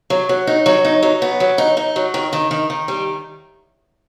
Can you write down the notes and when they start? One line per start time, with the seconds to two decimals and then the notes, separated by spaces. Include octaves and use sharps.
0.10 F#3
0.29 F#3
0.47 D#4
0.66 F#3
0.85 D#4
1.03 F#3
1.22 B3
1.40 F#3
1.58 D#4
1.77 D#4
1.96 F#3
2.14 D#3
2.33 D#3
2.51 D#3
2.70 D#3
2.88 G3